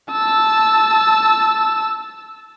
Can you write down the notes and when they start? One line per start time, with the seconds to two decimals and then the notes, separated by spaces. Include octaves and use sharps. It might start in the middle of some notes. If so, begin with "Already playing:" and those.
0.12 A5 E6